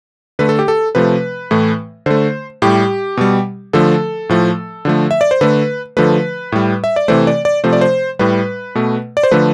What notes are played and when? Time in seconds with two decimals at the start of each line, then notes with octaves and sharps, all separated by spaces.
0.39 D3 A3 B4
0.49 A4
0.59 G4
0.68 A4
0.95 C3 F3 A3 B4
1.51 A2 E3 A3
2.06 D3 A3 C5
2.62 A2 G3 G4
3.17 B2 G3
3.73 D3 F3 A3 A4
4.29 A2 F3 A3
4.85 D3 F3 A3
5.11 E5
5.21 D5
5.31 C5
5.41 D3 A3 B4
5.97 D3 F3 A3 B4
6.52 A2 G3
6.84 E5
6.96 D5
7.08 C3 E3 A3 C5
7.27 D5
7.45 D5
7.64 C3 F3 A3 C5
7.73 D5
7.81 C5
8.19 A2 G3 B4
8.75 B2 A3
9.17 D5
9.23 C5
9.31 D3 F3 A3 B4